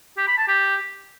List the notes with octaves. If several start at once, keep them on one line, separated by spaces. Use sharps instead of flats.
G4
B5
A5
G4